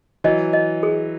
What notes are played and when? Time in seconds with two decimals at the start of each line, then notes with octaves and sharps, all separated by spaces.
0.24 E3 F#3 D#5
0.53 D#5
0.83 G#4